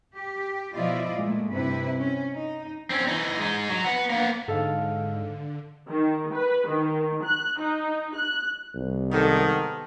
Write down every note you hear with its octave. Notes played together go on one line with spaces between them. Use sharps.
G4
B2 F3 E4 F4 D5 D#5
A#2 G#3 A3
G2 C3 C4 E4 B4
C#4
D#4
C4 C#4
E3 D#4
G#3 D#4
F#3
B4 F#5
A#3 B3
G#2 D3 A4 F5
D#3
B4
D#3
F#6
D#4
F#6
C2
G#2 D#3 B3 G4 A4